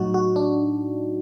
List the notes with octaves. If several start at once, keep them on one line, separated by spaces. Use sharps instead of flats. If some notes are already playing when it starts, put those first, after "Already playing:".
Already playing: A2 F#3 D#4 F#4
F#4
D4